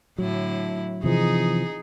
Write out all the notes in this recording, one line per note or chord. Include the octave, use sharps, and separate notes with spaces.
A2 D3 F#3 E4
C3 E3 F3 D#4 G#4